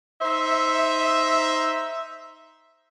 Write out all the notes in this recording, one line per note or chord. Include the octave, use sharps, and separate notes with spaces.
D#4 C5 E5